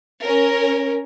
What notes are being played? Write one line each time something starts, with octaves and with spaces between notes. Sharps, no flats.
C#4 A#4